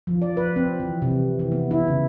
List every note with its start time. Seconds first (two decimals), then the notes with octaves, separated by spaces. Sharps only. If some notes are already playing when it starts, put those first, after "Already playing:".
0.07 F3
0.22 D5
0.37 B4
0.56 C4
0.80 E3
1.02 C3
1.39 E3
1.52 B3
1.71 E4
1.88 C#3